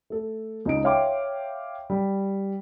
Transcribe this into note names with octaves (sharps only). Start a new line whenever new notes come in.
A3 A4
C#2 D#4 D7
C#5 E5 F5 G5 C6 D6
G3